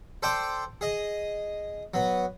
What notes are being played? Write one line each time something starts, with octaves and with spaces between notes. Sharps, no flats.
A4 C5 D5 G5 D6
G#4 D#5
F#3 B3